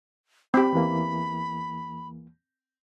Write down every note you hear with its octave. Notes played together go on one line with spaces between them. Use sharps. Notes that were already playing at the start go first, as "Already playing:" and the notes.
C4 G4 B5
E2 E3 A#3